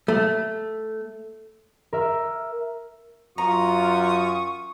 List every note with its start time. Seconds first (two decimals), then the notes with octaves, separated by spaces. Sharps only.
0.08 A3
1.93 A#4 E5
3.38 F#2 F4 A#5 C#6 D#6